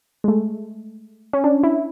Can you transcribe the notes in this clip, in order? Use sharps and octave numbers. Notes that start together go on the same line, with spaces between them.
G#3
A3
C#4
D4
E4